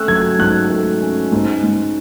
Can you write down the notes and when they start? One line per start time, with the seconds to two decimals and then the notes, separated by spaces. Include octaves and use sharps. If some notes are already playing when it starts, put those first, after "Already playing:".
Already playing: A3 C#4 E6 F#6
0.08 F#3 G#6
0.39 G#2 F#6
0.70 A3
1.01 C#4
1.32 G#2
1.63 G#2